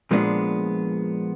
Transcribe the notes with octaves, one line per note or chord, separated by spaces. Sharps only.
A#2 F3 G#3 B3 D4